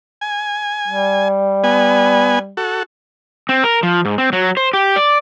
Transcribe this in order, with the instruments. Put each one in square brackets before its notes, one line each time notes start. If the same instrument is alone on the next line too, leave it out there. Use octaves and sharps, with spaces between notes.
[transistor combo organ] G#5
[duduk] G3
[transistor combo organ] B3 G#5
F#4 A4
[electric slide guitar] C4
A#4
F3
G#2
C4
F#3
C5
G4
D5